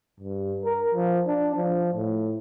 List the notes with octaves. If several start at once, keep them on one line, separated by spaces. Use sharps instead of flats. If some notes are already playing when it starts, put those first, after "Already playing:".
G2
A#4
F3
D4
F3
A2